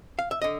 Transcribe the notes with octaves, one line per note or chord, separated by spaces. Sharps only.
F5
E5
D3 D#5